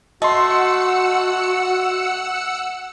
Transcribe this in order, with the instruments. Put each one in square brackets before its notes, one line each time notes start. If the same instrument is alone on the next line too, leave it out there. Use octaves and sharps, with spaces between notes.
[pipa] A3 [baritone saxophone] F#4 [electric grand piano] D#5 C6 [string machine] F#5 E6 C#7